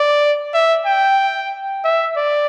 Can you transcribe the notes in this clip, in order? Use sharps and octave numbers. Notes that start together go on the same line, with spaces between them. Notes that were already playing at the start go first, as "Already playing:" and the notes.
Already playing: D5
E5
G5
E5
D5